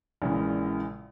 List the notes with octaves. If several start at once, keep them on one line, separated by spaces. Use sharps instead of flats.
A#1 A#2 C#3 E3 G#3